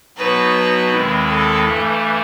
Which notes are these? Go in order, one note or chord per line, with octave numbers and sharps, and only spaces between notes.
B2 F#3 B3 D#4 F#4 B4
D#2 D#3 G#3 C4 E4
A4
G2 E3 A3